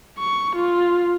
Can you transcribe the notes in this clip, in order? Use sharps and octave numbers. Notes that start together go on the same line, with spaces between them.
C#6
F4